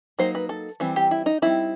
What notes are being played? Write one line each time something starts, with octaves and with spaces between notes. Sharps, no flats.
F#3 A#3 D#4 C5
B4
A4
E3 G3 C4
G4
E4
D#4
G3 C4 D#4 E4